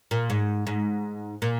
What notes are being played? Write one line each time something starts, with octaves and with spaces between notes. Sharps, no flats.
A#2
G#2
G#2
A#2